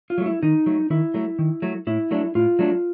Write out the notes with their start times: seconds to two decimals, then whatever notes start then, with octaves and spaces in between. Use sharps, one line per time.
0.10 F4
0.18 F#3 A3
0.26 E4
0.43 D#3 D#4
0.66 F#3 A3
0.90 D#3 E4
1.14 F#3 A3
1.39 D#3
1.62 F#3 A3
1.87 A2 E4
2.11 F#3 A3 D4
2.35 A2 F4
2.59 F#3 A3 D4